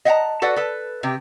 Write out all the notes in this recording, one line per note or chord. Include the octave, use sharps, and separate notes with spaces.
D#5 E5 F#5 G5 A5 A#5
F#4 A4 B4 D5 F#5
A4 B4
C3 G4